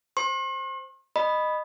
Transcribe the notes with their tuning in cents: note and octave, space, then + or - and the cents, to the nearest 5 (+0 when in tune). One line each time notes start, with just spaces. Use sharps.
C5 +0 C6 +45
D#5 -15 B5 +0